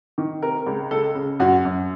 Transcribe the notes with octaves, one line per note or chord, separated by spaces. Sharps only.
D#3
C3 A#4
C#2
C#2 A4
C#3
F#2 F#4
F#2